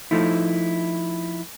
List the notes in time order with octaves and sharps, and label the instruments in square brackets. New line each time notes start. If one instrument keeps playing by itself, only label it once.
[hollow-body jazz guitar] F3 A3 D#4 E4